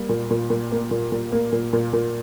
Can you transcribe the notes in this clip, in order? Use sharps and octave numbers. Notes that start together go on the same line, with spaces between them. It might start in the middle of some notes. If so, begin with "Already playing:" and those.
Already playing: G3 A#3
A#2
A#2
A#2
A#3
A#2
A#2
A#3
A#2
A#2
A#2